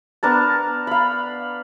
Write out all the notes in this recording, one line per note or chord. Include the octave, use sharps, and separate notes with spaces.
B3 D4 A#4 A5
F5 B5